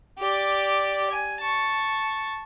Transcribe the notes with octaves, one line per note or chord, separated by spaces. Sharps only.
G4 D5
G#5
A5 C#6